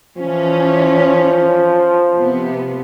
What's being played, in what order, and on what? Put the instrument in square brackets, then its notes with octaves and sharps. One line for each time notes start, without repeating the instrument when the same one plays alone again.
[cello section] E3 C#4 [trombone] F3
[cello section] C3 B3